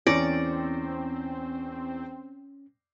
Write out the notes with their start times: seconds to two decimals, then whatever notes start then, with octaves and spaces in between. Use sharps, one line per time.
0.07 E2 C4 C#4 D5 A#6 C#7